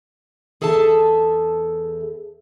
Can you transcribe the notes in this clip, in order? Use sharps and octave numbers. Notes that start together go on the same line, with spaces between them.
E2 G#4 A4 E5 A5